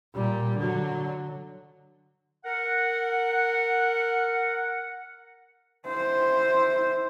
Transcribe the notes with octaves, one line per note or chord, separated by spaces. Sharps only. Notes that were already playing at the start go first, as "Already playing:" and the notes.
A#2 G3
D3 F#3
A#4 F#5
E4 C5